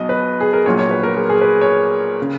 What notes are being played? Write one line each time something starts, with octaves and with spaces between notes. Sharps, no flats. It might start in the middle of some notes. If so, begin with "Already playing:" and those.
Already playing: B1 B2 F#3 D#5
B4
G#4
A#4
A#1 A#2 F#3 C#5
C#5
B4
A#4
G#4
G#4
B4
C#5
C#3